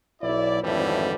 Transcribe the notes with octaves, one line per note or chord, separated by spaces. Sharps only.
B1 E4 D5
G#1 F2 A2 D3 E3 G3